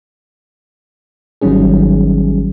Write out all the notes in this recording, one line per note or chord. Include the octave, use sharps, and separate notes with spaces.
G#1 D#3 F#3 G3 C#4 G#4